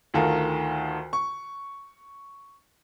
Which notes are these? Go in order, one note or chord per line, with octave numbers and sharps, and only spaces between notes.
D2 D#3 F4 A4 A#4
C#6